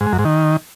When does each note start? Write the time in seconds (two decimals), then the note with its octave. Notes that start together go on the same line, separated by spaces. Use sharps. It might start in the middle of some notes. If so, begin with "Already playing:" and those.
0.01 G#2
0.07 G#3
0.13 F#2
0.19 G#2
0.25 D#3